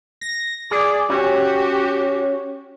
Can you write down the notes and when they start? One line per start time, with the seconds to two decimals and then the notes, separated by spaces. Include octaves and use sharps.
0.21 A#6
0.71 G#4 D5
1.10 C#4 F#4 G4